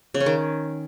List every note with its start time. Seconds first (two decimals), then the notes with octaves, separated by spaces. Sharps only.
0.14 C#3
0.20 C#4
0.26 D#3